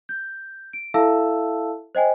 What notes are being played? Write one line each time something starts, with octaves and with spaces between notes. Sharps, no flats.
G6
D7
E4 A4 E5 F5 A5 E6
C5 D#5 G5 G#5